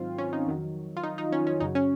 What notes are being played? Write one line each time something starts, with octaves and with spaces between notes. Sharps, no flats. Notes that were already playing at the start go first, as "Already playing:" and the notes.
Already playing: G#2 D#3 F#3 C4 F4
C#4
D#4
F2 D#3 F#3
F4
D#4
D#4
C#4
C#4
F#2 C#3 F#3 D#4
C#4